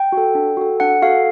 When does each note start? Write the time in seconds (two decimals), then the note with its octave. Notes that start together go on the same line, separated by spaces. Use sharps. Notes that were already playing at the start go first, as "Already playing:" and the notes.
Already playing: G5
0.12 F#4 A4
0.35 D4
0.57 F#4 A4
0.80 D4 F#5
1.02 F#4 A4 F5